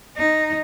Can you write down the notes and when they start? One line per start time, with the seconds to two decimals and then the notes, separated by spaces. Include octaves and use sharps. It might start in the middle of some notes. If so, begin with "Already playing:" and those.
0.17 D#4